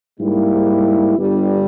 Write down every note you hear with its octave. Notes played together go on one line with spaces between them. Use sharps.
G#2 G3 A#3 E4
G1 G2 G3